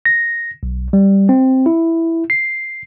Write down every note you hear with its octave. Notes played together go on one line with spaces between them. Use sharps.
A#6
B1
G3
C4
E4
C7